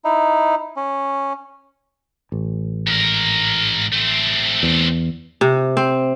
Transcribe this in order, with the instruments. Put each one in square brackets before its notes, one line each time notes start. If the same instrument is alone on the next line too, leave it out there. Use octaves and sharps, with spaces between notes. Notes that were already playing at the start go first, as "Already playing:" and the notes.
[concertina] D#4 E4
C#4
[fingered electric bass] A1
[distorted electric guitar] G#2 A#4
A3 C4
[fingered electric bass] E2
[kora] C3
C4